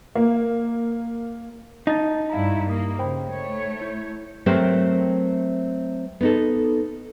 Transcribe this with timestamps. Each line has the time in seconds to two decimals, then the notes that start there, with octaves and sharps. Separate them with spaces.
0.15 A#3
1.87 D#4 A5 A6
2.30 G2 E4 F5 A#5
2.70 A#3 D#6
2.99 C#3 C5 G5 B5
3.30 A3 C#5
3.81 E4 G6
4.46 F#3 A3 C4 G4 A#4 C5
6.21 B3 D#4 A4